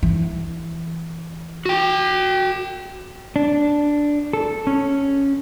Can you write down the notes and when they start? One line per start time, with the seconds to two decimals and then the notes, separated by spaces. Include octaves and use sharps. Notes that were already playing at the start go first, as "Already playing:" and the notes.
0.03 E3
1.66 F#4 G5
3.36 D4
4.33 A4
4.67 C#4